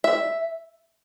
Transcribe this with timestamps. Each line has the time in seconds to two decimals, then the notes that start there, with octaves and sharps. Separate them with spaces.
0.04 E5